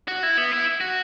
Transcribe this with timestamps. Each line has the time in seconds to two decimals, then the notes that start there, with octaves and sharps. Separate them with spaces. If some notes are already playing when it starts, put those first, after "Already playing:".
0.08 F#4
0.23 E4
0.37 B3
0.52 E4
0.81 F#4